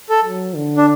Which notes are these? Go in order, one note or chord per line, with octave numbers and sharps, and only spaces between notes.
A4
F#3
D3
D4